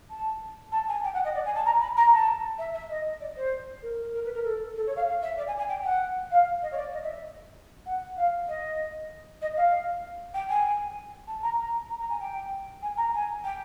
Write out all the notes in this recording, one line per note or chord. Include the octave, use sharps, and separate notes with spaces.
A5
A5
G#5
G5
F#5
D#5
D5
G#5
A5
A#5
B5
A#5
A5
E5
E5
D#5
D5
C5
A#4
A#4
A#4
B4
A#4
A4
A4
C#5
F5
F5
E5
D5
G#5
G#5
G5
F#5
F5
D#5
C#5
D5
D#5
E5
F#5
F5
D#5
D#5
F5
G5
G#5
A5
A#5
A#5
A#5
A#5
G#5
G5
G#5
A#5
G#5
G5